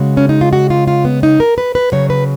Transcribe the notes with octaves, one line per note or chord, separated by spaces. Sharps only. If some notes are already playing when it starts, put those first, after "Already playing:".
Already playing: C#3 G#3 F#4
C#4
D#4
F4
F#4
F4
F4
B3
D#4
A#4
B4
B4
C#3 F#3 C#5
B4